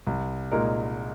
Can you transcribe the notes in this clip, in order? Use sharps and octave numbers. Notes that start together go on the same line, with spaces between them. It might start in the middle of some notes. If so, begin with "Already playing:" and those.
C2
A#2 G#3 D#4 A#4